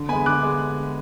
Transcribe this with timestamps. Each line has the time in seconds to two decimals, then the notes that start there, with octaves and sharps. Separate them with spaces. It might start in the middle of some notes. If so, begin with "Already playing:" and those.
Already playing: D3
0.09 B3 G#5 B5
0.13 G#3
0.26 D3 D6 F#6
0.43 G#3